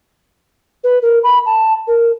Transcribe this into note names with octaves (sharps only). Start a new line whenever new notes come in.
B4
A#4
B5
A5
A#4